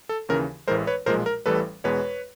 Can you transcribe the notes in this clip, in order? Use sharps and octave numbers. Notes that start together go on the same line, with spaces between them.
A4
D#2 C#3 E3 A#4
A1 A2 E3 G#3 A#4 C5
B4 C#5
B1 A#2 F3 G#3 A#4 C5
A#4
A1 A2 E3 G3 A4 B4
E2 B2 G#3 B4 C#5